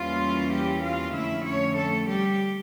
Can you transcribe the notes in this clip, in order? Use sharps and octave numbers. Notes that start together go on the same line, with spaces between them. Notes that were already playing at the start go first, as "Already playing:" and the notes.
Already playing: E2 E3 G3 A#3 C#4 F4
G3 G4
F4 F5
F2 D3 A3 C#4 E4 E5
C#4 C#5
A3 A4
G3 G4